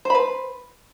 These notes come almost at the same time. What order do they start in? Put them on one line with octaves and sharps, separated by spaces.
C5 B5 B4